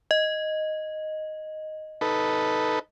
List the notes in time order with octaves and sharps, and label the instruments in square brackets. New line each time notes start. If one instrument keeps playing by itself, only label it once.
[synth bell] D#5
[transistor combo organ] D#4 A4 B4